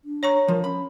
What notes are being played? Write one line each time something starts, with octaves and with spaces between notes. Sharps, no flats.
D4
C#5 A#5 C#6
F3 A#4
C#4 B5